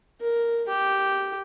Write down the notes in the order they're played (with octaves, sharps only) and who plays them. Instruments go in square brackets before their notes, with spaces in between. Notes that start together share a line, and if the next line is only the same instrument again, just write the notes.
[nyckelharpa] A#4
G4